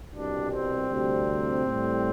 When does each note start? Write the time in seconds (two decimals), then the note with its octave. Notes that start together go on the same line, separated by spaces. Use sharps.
0.12 C2 B2 G3 D4
0.51 C4
0.90 D2 C3 G3
1.66 A2 G3